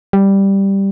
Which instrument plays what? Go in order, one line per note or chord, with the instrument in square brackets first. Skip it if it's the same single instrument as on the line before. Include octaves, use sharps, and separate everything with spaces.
[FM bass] G3